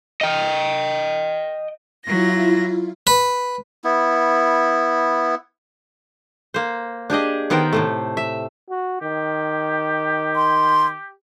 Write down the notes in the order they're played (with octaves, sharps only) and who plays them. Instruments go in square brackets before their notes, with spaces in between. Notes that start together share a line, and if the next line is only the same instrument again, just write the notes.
[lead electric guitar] D#5 G5
[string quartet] F#3 A#6 [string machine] E4 F4
[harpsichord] B4
[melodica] B3 E4
[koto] A#3 C5
D4 G4 G#4 D#5
D#3 B3 A#4 C5 G5
A2 C3 A3
E5
[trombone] F#4
[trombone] D#3 [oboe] G4
[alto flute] C6